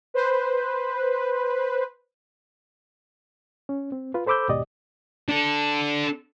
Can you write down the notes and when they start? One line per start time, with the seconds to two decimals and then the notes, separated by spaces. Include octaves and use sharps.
0.14 B4 C5
3.69 C#4
3.92 C4
4.14 F4 B4
4.26 A4 C5 B5 D6 E6 G6
4.48 D#2 G#2 B2 G4 D5 D#5
5.29 D4 A4